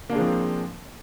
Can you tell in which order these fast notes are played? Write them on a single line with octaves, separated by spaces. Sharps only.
A#3 D4 G#3 F3 C4